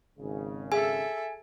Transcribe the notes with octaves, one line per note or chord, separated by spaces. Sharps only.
G#1 C#3
G#4 A4 E5 G#5